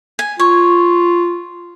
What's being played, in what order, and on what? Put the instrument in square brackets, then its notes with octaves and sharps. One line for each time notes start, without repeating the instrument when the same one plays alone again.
[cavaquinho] G#5
[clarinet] F4 [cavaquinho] C#5